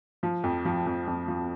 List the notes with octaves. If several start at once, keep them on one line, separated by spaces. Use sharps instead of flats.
F3
F2
F3
F2
F2
F3